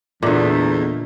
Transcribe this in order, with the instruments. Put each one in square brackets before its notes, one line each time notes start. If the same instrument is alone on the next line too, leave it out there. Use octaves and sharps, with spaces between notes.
[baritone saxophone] E2 [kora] A#2 D3 [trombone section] A3 D#4